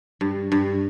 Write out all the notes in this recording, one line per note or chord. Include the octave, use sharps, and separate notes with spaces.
G2
G2